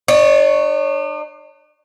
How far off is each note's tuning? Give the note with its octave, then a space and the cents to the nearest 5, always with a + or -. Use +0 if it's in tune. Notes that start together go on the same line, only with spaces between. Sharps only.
D4 +45 C#5 +0